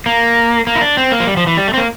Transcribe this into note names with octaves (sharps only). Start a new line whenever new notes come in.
A#3
A#3
E4
D4
C4
A#3
F3
G3
F3
E3
G3
A3
C4
A#3